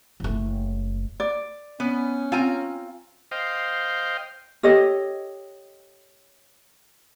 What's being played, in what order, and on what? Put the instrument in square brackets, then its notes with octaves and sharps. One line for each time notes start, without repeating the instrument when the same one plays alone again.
[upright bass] F#1 A3
[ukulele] D5
[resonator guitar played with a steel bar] B3 [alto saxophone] C#4
[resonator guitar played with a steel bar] C4 G#5 A#5 [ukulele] F4
[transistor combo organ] C5 D#5 F5 G5
[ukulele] G4 A4 C#5 D#5